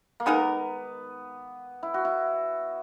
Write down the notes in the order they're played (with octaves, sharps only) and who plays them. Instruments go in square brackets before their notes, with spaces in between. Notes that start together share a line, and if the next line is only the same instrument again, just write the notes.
[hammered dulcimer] A#3
[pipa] D#3 G#3 D#4 A#4 [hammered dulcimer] B3
[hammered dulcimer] E4
F#4
E4